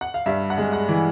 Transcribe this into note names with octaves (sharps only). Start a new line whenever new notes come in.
F#5
F5
G2 E5
F#5
G#3
F#5
E3